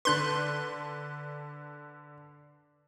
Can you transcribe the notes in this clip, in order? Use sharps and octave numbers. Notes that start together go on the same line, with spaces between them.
D3 D4 B4 C6 F#6